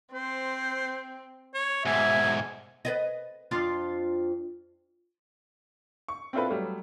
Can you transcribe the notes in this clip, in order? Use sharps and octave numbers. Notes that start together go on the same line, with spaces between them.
C4 C5
C#5
G#2 B2 E5 G#5
B4 D5 D#5
F2 D4 F4
C#6
C4 D4 E4 F4 A4 B4
F#3 G3 A3